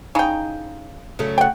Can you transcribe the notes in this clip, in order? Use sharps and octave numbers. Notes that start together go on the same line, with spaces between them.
C#3 D#4 G5
C#3 F#3 A3
F#5 G5